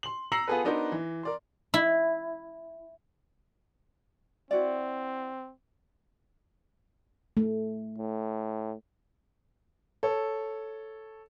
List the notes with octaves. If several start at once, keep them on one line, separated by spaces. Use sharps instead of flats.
C6 F#7
A#5 E6 A#6 C7 C#7 F#7
B3 F4 G#4 A4 B4
B3 D4 D#4 F#4 A#4 C5
E3
A#4 D5 C6
E4
C4 E4 F#4 D5
A3
A2
A4 C#5